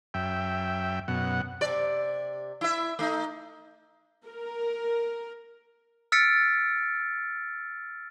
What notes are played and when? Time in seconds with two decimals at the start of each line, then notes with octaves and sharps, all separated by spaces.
0.14 F#2 E5 G5
1.08 F#2 B2 F#5
1.61 C3 D5
2.61 E4 E5
2.99 A3 D#4
4.26 A#4
6.12 E6 F6 A6 B6 C#7 D7